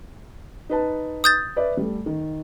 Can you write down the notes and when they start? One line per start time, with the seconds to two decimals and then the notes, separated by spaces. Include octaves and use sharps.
0.70 D#4 B4 A5
1.24 D#6 G6 A6
1.56 B4 D5 E5
1.77 G3 A3
2.06 D#3